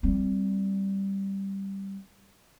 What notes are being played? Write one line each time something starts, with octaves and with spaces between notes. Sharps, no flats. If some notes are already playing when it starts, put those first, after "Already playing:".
G3 C4